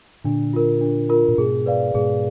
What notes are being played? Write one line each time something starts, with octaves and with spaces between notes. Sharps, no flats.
A#2 D3 D4
F4 A#4
D4
F4 A#4
A#2
G#2 B2 G#4
B4 D5 F5
G#2 B2 G#4